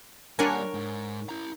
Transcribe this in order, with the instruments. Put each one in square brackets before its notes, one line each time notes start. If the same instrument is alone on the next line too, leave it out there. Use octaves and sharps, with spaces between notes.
[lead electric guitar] G3 A#3 [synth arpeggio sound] D4 F#5 G#5 [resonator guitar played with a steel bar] A#4 C#5
[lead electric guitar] G#2
E4 A#5